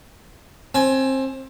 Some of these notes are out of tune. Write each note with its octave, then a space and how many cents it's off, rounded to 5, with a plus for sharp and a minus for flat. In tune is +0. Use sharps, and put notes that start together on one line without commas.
C4 +25 G#5 +20